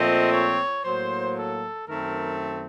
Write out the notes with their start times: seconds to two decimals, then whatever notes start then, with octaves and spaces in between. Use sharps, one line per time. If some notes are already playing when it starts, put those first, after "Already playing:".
Already playing: A#2 F3 A3 C4 D#5
0.31 C#5
0.83 A2 F#3 A#3 C5
1.35 A4
1.87 F#2 D#3 A3 C4 A#4